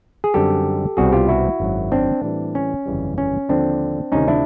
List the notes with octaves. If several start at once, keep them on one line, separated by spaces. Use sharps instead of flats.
G#4
F#2 D3 G3 C4 G4 A4
C2 B2 G3 C4 F#4 G#4
F4 G4
E4 F#4
G#1 F#2 D#3 F#3
C4 D4
A2 E3 G3 C4
C#4
G1 F2 C#3 E3 G3
C#4
D#2 D3 F3 C4 D4
D2 C3 D#3 C#4 D#4
D4 E4